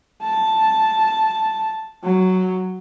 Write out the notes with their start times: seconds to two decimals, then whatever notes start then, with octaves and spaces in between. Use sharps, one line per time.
0.22 A5
2.03 F#3